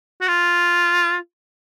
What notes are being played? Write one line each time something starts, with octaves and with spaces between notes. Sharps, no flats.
F#4
F4